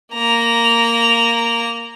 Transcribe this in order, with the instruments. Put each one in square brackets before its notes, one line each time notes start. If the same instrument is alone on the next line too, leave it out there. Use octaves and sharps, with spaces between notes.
[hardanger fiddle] A#3 A#5